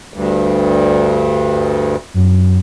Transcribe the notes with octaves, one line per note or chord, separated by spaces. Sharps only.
D2 G2
F#2